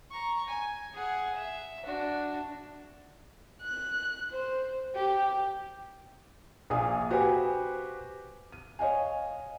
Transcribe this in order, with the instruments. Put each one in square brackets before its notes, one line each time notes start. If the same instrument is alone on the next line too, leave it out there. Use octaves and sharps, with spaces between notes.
[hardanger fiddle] A#5 C#6
G#5
G#4 F#5
E5
D4 F#4
[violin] F#6
C5
G4
[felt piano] A#1 A#2 G#4 F5 D#6
F#4 G4 B4 C5 G#5
D#7
C#5 D#5 F5 G#5